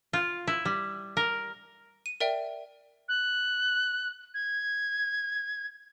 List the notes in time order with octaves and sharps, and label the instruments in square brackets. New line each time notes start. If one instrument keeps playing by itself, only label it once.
[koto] F4
E4
G3
A#4
[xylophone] D#7
A#4 D5 E5 G5
[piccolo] F#6
G#6